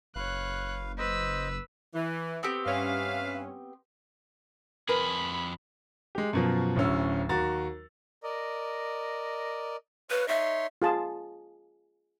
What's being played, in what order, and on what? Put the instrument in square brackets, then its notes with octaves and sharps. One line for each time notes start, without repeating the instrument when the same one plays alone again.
[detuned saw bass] F#1 [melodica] B4 F5 [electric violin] C#5 F#6
[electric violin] B4 E6 [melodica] C5 D#5
[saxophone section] E3
[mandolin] B3 C4 G4
[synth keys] G2 C#4 [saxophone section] B4 E5 F5
[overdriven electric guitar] F2 G#4 [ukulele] A#4 B4 [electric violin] B5
[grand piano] G#3 G4
F#2 B2 F3
D1 D2 C#4 E6
D#2 F#4 A#5 A6
[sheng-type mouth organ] A#4 D5 D#5
[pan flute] B4 [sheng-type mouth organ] C#5 F5
[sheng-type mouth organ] D#4 C#5 C6 [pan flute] E5
[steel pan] F4 G#4 A5